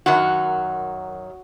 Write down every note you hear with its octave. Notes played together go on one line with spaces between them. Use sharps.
F#2 D#3 F#3 F#4